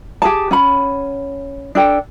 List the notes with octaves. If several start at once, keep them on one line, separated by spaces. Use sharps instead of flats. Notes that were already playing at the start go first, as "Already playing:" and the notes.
G4 G#4 A5
C#4 F#5 B5
D4 A4 G5